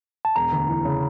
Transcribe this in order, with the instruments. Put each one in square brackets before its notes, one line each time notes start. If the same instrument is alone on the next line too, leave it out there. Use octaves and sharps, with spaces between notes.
[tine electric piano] A5
[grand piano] E1 [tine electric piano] A#5
[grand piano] D2
E3
C#3